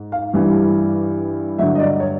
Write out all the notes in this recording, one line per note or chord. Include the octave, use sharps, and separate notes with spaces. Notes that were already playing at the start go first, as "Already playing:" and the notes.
Already playing: G#2
F5
G2 E3 G3
G2 D3 F#3 E5
D#5
D5
C#5